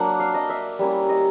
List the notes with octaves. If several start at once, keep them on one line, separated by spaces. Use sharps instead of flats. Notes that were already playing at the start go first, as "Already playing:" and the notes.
Already playing: F#3 A#3 D4 F#5
F5
D#5
E5
G3 A#3 C#4 E4
D#5